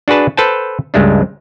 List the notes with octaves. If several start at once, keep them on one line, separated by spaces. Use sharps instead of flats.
D4 F#4 G#4 B4 A5
A4 B4 C5 G5 A5
C#2 G2 G#3 A3 D4